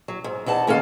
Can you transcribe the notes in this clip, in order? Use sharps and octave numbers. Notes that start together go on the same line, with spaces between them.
F#3
G#2
E2 D#4 F#5 A5
D#2 C#4 A4 F5